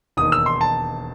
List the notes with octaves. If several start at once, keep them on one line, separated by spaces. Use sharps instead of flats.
E1 D#2 D#3 D#6
E6
C6
A5